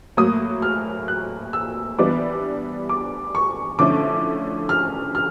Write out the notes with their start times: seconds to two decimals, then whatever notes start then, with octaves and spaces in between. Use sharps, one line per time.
0.17 A2 F#3 A#3 D#6
0.62 F6
1.08 F#6
1.53 E6
1.99 E3 G3 B3 D4 D6
2.89 D6
3.35 C#6
3.79 D3 F3 A3 C#4 E4 D6
4.69 F6
5.15 F6